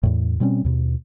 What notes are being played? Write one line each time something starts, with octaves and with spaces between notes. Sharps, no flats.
E2 A2
B2 G3 C4 C#4
D#2 B2